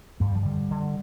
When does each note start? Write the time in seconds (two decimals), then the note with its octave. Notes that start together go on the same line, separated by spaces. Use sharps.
0.20 G2 A3
0.28 G3
0.35 F3
0.43 D3 G3
0.71 D3